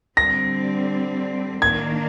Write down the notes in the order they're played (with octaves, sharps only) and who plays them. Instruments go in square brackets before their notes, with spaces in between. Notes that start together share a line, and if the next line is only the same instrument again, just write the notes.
[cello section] D3 G3 C4 [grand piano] A#6
[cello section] D#3 A#3 D4 [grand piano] G#6